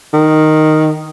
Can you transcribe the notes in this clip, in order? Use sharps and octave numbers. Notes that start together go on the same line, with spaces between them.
D#3